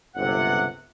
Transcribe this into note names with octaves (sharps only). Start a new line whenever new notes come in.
G1 C#2 C3 F#5